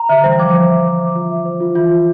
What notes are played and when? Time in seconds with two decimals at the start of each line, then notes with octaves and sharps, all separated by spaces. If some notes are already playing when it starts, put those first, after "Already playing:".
Already playing: A#5
0.09 D3 E5
0.24 E3 G3 C5
0.39 D3 F3 D6
0.55 C5
0.70 E5
0.84 C5
1.00 D6
1.15 F4
1.30 E5
1.45 C5
1.61 F4
1.75 E3 F4
1.90 F4